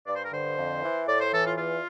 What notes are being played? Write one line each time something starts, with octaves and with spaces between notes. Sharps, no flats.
G2 D5
C5
A#4
D3 C5
F2
E3
A2 D5
C5
E3 A4
F4
E2 F4